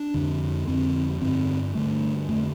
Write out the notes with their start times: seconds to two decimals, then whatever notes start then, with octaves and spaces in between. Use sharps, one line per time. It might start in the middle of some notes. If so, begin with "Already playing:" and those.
Already playing: D4
0.14 F2 D3
0.67 F2 D3 C4
1.21 G2 D3 C4
1.75 G2 D3 A3
2.28 F2 D3 A3